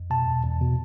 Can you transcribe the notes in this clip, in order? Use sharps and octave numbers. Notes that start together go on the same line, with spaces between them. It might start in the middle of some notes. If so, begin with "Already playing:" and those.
Already playing: F2
B2 A5
E2
E2
B2